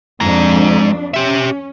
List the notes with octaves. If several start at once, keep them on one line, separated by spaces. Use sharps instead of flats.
F2 G#3 D4 A#5
C#4 G4 E5